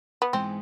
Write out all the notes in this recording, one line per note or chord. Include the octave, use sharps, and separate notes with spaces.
B3
G#2 E3 G#3 B3 C4 D#4